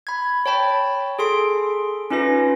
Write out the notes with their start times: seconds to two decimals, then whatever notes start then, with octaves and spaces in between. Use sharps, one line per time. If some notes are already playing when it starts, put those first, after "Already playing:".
0.07 B5 G#6
0.46 C#5 G5 A5 B5
1.19 G#4 A4 C6 D7
2.10 C#4 D#4 F4 B4 A#6